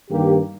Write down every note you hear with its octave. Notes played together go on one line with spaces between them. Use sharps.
G2 D#3 A#3 G4